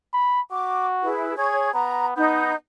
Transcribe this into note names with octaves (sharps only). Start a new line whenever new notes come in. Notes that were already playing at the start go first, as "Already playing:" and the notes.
B5
F#4 D6
E4 G#4 B4
G#4 C#5 C#6 G#6
B3 A#5
B3 D#4 G6